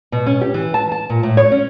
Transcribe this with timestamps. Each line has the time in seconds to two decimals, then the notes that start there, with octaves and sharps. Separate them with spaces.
0.12 B2
0.26 C#4
0.41 G4
0.54 E3
0.74 A5
0.92 A5
1.10 A#2
1.23 A2
1.37 C#5
1.52 C#4